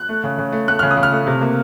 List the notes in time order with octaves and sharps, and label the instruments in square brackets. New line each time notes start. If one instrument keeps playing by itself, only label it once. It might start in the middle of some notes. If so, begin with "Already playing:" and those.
Already playing: [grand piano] F#6
A3
C#3
C#3
A3
A3 F#6
C#3 F6
D#6
C#3
F6
A3
C3
A#3